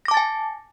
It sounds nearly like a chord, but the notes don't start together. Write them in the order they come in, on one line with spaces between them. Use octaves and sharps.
A#6 D6 A5 A6 G#5